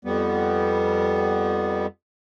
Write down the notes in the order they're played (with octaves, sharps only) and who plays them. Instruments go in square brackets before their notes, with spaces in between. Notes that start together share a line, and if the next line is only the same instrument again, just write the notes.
[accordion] F2 G3 B3